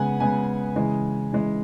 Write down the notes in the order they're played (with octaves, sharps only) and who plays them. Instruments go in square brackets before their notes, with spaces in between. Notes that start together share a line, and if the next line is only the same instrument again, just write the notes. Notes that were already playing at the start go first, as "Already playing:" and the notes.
Already playing: [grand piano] C#3 G#3 B3 F#5 G#5
C#3 G#3 B3 G#5
C#3 E3 G#3
C#3 E3 G#3